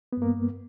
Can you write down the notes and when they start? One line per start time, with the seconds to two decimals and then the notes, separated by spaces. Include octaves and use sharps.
0.13 B3
0.17 G2
0.22 A#3